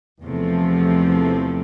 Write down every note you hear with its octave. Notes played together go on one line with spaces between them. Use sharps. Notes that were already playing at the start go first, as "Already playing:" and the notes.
E2 C3 F3 A3